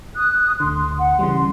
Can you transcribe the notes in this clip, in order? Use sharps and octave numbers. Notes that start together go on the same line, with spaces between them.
D#6 F#6
D2 D3 C6
F#5
C#3 E3 G3 C6